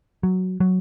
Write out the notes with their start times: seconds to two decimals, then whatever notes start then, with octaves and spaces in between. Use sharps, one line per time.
0.23 F#3
0.60 F#3